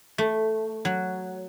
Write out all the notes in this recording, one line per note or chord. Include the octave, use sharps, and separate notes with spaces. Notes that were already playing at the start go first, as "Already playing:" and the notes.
A3
F#3